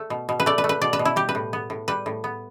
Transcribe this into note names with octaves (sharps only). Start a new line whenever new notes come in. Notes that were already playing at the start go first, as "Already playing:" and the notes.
Already playing: A3
B2
B2
B4
A3 D5
B4
A3
B4
B2 D5
B4
B2
E4
G3 G4
B4
A2
B3
A2
G3 B4
A2
B3